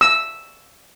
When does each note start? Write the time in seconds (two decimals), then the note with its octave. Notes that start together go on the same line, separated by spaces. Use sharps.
0.01 E6